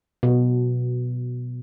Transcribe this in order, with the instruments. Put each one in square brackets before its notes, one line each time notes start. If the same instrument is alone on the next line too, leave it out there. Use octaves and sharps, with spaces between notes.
[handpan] B2